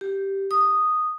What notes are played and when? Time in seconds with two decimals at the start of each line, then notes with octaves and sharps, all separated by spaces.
0.01 G4
0.51 D#6